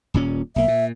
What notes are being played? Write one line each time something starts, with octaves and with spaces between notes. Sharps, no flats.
D#1 A#2 C#4
B1 A#3 E5
A#2